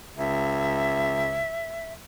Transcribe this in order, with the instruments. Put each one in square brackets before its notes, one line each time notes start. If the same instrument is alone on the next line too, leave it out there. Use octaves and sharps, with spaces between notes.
[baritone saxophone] C#2 [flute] E5